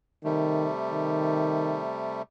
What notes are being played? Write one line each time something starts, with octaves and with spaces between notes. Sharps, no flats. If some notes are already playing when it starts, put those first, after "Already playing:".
C3 D#3 G3 A3
D#3